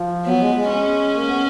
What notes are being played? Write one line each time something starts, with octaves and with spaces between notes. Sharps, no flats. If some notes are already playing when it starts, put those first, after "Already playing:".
Already playing: F3
F#3 B3
G#3
G#3
C#4
A#3
B3